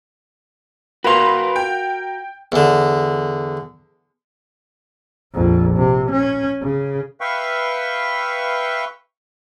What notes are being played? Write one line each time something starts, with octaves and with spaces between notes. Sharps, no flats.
F#4 A#4 B4 F5 C6
G5
E2 D3
A#1 F2
C3
C#4
C#3
B4 E5 F5 G5 C#6